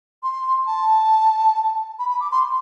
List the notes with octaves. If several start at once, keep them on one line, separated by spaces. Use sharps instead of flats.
C6
A5
B5
B5
D6
C6